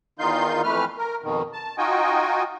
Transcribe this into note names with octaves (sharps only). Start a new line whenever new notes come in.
E2 D#3 D#4 F4 C6 G6
F2 E3 A3 B4 F6
A#4
F2 B2 D#3
A5
D#4 F4 F#4 D#5 G5 G#5